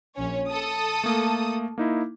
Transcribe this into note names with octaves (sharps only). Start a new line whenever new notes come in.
A#1 C#4 C#5
A4 D#6
A3 A#3
A#3 D#4 E4